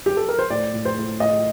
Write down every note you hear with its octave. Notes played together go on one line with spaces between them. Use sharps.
G4
A4
A#4
C5
A2 D5
A2
C5
A2
A2 D#5